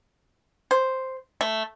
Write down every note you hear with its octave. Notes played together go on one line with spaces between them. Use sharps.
C5
A3